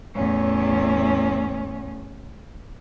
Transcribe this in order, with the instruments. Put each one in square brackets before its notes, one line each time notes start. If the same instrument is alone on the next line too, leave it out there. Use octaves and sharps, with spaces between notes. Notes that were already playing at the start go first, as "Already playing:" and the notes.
[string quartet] E2 A2 C#4 C#5